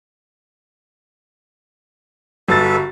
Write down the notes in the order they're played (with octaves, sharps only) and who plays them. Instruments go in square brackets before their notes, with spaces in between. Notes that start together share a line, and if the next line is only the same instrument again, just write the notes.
[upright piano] G1 A6 [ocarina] F#4 [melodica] A4 B4 E5